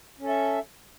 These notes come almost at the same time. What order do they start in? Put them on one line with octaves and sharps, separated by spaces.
C#4 A4 E5